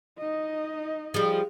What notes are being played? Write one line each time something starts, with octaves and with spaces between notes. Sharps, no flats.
D#4 D#5
F3 G3 G#4